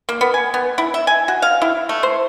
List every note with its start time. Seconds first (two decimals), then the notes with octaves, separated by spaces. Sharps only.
0.09 A#3
0.21 B3
0.34 G#5
0.54 B3
0.78 E4
0.94 E5
1.07 G#5
1.28 F#4
1.42 F5
1.62 E4
1.89 A3
2.03 C5